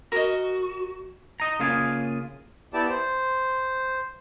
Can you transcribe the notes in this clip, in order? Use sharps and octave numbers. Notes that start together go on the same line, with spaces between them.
F#4 A#4 D#5
D#5 A#5
C#3 A#3 F4 G#4
B3 E4 G4 D5 A5
C5